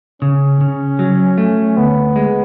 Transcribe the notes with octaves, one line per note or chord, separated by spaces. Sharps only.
C#3 C#4
C#3
F#3
A3
D2 B3
G#3